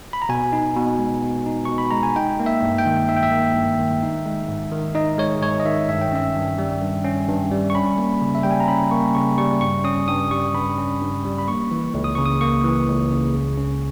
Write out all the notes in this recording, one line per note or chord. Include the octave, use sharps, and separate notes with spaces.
B5
A#5
B2 G#5
D#4
B2
G#3
B2
D#4
B2 C#6
B5
G#3 A#5
G#5
D#4 G5
A#3
E5
G2
G5
D#3
D#4 E5
G5
E5
A#3
G2
D#3
D#4
G#3
G#2
D#3
D#4 D#5
G#3 C#5
G#2 C#5
D#5
D#3 E5
G2 E5
G5
C#4 E5
G2
G3
G2
C#4
G2
G3
C#6
C#4 B5
A#3
C#3
E5
G3 G5
G#5
A#5
C#4 B5
A#3 C#6
C#3 C#6
G3 C#6
G2 C#6
C#4 D#6
G2 D#6
G3 C#6
G2 B5
C#4
G2
G3
B5
A#3 C#6
E3
C#2
D#6
C#3 C#6
D#6
A#3 C#6
E3
C#2
C#3
C#3
C#4